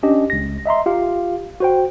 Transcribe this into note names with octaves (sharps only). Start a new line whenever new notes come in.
C#4 D4 G4 D#5
C#2 A#6
D#5 E5 A#5 C6
F4 G4 F5
F#4 C5 G5